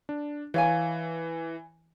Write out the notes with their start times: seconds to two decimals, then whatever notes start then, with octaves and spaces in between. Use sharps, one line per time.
0.09 D4
0.54 E3 C#5 F5 G#5